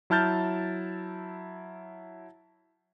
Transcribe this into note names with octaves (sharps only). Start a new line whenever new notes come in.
F#3 E4 A5 F6 G6 A6